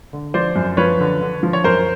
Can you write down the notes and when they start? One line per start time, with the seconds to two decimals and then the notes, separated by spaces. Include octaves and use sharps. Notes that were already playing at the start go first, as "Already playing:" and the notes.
0.13 D3
0.34 F3 C5 D5
0.56 F#2
0.77 F3 B4 C#5
1.00 D3
1.21 D3
1.43 F3
1.53 C#5
1.64 F#2 A#4 C5